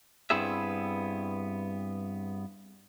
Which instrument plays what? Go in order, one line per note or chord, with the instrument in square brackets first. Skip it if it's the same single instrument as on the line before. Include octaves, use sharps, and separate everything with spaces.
[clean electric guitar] G2 B3 C4 E4 G#4 E5